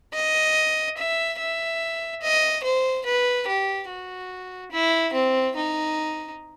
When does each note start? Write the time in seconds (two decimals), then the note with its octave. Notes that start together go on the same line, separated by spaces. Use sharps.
0.14 D#5
0.97 E5
1.39 E5
2.22 D#5
2.64 C5
3.06 B4
3.47 G4
3.89 F#4
4.72 E4
5.13 C4
5.56 D#4